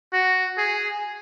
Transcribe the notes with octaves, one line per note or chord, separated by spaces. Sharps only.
F#4
G#4